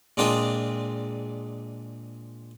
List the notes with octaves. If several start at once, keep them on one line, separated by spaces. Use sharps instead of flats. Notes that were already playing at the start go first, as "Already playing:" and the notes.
A#2 G#3 C4 D4 F4 G#4